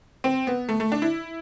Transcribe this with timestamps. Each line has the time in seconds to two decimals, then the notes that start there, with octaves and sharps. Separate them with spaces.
0.24 C4
0.47 B3
0.69 A3
0.80 A3
0.92 D4
1.02 E4